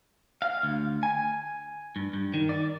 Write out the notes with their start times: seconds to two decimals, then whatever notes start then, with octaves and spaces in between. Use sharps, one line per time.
0.42 F5
0.63 D2
1.03 G#5
1.96 G2
2.13 G2
2.34 D#3
2.49 D5